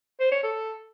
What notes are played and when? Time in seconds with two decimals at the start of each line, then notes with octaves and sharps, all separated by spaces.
0.20 C5
0.32 C#5
0.44 A4